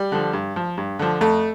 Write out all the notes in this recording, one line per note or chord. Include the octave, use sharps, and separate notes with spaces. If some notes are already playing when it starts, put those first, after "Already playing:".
Already playing: G3
D3 F3
G2
F3
G2
D3 F3
F2 A3